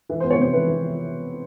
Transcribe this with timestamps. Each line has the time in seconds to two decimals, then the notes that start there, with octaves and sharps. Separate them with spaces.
0.09 E3
0.20 B3 C5
0.30 C#5
0.39 C3 C5
0.53 E3 B4
0.67 E3